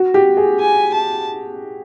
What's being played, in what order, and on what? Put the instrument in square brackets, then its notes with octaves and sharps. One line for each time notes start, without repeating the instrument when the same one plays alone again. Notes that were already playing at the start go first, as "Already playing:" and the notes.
Already playing: [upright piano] F#4
G4
G#4
[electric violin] G#5
A5